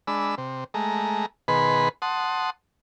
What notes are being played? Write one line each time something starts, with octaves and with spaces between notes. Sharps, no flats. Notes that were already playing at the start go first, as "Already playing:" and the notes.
G#3 D4 B5 E6
C3
G#3 A3 A#5
B2 D#3 G#4 B4 B5 C6
F#5 A5 C6 D#6